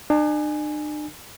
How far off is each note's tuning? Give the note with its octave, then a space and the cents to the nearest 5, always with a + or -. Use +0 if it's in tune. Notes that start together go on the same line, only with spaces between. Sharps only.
D4 +45 G#5 +0